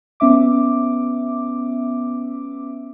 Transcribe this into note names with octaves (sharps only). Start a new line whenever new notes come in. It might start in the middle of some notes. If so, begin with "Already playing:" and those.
B3 C#4 E5 D6